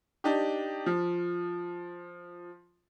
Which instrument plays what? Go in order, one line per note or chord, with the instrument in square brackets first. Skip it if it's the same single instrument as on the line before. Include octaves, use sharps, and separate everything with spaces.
[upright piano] D4 D#4 G4
F3